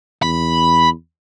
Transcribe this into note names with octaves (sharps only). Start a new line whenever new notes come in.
E2 B5